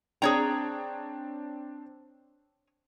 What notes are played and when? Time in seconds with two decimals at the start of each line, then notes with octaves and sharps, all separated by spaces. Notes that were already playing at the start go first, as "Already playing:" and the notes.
0.22 C4 D4 G#4 C#5 G5 A#5